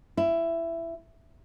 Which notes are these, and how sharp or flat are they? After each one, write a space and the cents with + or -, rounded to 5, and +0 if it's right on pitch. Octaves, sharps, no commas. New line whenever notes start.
E4 +15